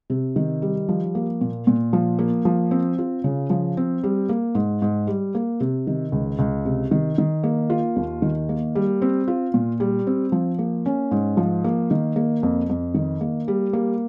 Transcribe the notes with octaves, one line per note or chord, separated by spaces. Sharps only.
C3
D#3
G3
F3
A#3
A#2
A#2
F3
A#3
F3
C4
F4
C#3
F3
C4
G3
A#3
G#2
G#2
G3
A#3
C3
D#3
C#2
C#2
C3
D#3
D#3
A#3
F4
D#2
D#3
A#3
G3
C4
F4
A#2
G3
C4
F3
A#3
C#4
G#2
F3
A#3
D#3
A#3
F2
F2
D#3
A#3
G3
A#3